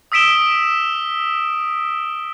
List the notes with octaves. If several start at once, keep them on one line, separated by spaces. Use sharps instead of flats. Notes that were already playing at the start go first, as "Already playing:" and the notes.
D#6 E6 B6 D7 E7 G7